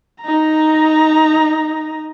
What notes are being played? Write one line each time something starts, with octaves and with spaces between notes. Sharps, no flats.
D#4 A#5